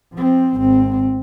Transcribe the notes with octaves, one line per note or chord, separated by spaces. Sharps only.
F3 C4
G#1 C4